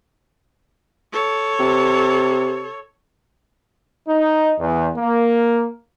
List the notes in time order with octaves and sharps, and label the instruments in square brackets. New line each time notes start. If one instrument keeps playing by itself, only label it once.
[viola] A4 C#5
[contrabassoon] C3
[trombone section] D#4
E2
A#3